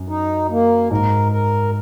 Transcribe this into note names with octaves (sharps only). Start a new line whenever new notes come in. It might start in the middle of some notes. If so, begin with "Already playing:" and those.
Already playing: F#2
D#4
A#3
G#2 A#4
A#4